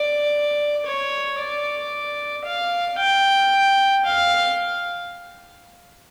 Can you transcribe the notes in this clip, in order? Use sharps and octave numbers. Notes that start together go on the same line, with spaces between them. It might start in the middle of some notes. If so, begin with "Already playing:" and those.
Already playing: D5
C#5
D5
F5
G5
F5